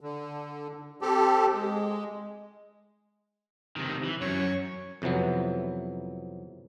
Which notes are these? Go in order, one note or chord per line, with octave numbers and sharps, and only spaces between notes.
D3
C4 G4 A4
G#3
C3 D#3
E3
F#2 C#5
F2 C3 E3 F#3 B3